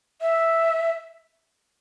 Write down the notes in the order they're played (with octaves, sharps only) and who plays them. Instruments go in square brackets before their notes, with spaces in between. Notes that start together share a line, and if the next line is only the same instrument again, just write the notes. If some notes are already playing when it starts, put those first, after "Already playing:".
[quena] E5